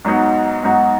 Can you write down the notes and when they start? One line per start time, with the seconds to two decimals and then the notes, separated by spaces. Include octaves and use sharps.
0.05 G#2 F#3 B3 D#4 F#4
0.63 G#2 F#3 B3 D#4 F#4